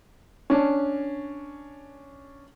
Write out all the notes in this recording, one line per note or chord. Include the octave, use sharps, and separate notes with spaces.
C#4 D4